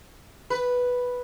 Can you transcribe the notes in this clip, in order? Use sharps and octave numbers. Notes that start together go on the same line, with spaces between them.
B4